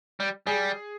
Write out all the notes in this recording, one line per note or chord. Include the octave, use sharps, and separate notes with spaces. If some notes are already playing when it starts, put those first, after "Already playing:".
G3
G3 G#4